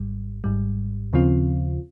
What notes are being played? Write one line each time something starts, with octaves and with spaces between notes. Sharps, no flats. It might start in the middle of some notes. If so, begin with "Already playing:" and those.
Already playing: G#1 G#2 G3
G#1 G#2 G3
D#2 C#3 F3 C4 F4